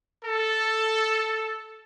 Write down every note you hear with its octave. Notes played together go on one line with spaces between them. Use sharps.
A4